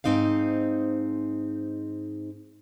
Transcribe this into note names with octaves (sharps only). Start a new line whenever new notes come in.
G#2 C4 D#4 C5 F5